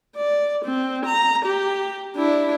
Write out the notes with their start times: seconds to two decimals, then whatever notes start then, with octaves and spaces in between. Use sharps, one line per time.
0.16 D5
0.66 C4
1.06 A#5
1.45 G4
2.17 D4 E4